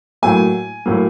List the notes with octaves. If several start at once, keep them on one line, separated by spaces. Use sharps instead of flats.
A2 F#3 A#3 G#5
A2 F#3 A#3